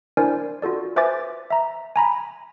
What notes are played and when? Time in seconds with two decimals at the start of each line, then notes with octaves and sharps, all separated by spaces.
0.17 D4 E4 A#4 C5 D5 G#5
0.62 F4 F#4 A4 D5
0.96 B4 C5 E5 G#5 D6 A6
1.50 E5 A#5
1.96 G#5 A#5 B5